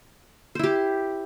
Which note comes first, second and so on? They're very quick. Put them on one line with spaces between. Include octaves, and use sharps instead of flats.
C5 E4 G4